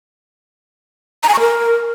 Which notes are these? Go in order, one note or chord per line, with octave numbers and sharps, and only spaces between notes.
A#5
G#5
C#6
A#4